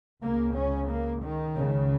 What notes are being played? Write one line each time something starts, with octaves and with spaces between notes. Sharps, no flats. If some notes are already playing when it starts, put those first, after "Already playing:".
C#2 C#3 A#3
C#4
A#3
D#3
C#2 C#3